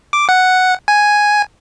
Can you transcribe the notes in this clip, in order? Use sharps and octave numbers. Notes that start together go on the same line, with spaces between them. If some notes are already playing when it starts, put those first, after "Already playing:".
D6
F#5
G#5